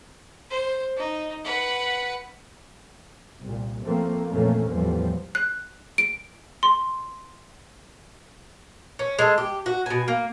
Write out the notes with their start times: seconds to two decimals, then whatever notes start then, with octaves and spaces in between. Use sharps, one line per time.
0.50 C5
0.97 D#4
1.44 B4 F#5
3.42 C2 A#2
3.83 F3 A3 A#3 C4
4.29 F2 A#2 E3 A3 A#3 C#4
4.68 E2 A2 E3 F3 G3
5.35 F#6
5.98 D7
6.63 C6
8.99 C#4
9.19 G#3 A4
9.38 G4
9.66 F#4
9.86 B2 G#5
10.08 A#3